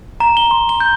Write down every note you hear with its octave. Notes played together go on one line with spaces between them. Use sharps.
A#5
G7
C6
G7
G6